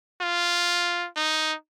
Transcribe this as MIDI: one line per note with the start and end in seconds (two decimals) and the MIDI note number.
0.22 1.07 65
1.16 1.54 63